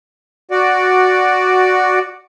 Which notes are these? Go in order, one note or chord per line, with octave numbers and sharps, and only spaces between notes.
F#4 D5